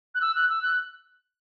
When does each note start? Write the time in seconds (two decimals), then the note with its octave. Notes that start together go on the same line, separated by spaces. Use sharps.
0.15 F#6
0.21 E6
0.35 F#6
0.50 E6
0.62 F#6